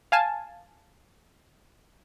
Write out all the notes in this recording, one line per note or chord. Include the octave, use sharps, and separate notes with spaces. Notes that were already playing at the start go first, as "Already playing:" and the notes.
F5 G#5 A5